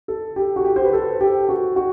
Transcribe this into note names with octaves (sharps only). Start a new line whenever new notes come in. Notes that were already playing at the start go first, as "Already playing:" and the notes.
A4
G4
F#4
G4
C5
B4
A4
G4
F#4
F#4